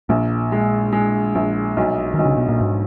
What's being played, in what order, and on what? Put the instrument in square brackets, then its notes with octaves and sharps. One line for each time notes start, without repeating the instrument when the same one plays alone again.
[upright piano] A#1 [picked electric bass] A#2
[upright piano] G#3
G#3
A#1
B1
[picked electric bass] D#3
[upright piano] B1
[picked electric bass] C#3
B2
A#2
[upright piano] B1 [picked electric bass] G#2